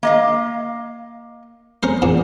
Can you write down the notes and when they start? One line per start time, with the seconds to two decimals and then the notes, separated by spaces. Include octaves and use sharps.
0.03 A#3 D#5 F5
1.83 C#4 A#4 C5
2.02 E2 A#2 D4